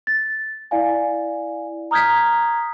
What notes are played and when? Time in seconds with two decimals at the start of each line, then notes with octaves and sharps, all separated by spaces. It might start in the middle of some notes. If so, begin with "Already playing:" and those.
0.07 A6
0.71 E4 D5 F5 G#5
1.91 A#5 D#6 F6 G6 G#6 B6